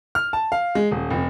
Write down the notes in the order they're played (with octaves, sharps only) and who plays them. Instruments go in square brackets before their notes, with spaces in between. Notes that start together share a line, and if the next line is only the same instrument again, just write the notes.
[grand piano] F6
A5
F5
G#3
D#1
F1